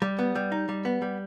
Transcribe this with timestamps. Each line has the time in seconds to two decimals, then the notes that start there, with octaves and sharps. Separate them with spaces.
0.02 G3
0.19 B3
0.35 G3
0.52 D#4
0.69 G3
0.85 B3
1.02 G3